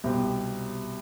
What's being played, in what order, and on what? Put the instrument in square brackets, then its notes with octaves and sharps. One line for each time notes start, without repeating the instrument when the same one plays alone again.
[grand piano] C2 B2 G3 C4 G4